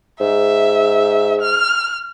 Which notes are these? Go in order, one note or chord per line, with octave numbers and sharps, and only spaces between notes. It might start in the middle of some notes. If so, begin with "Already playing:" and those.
G#2 E5
F6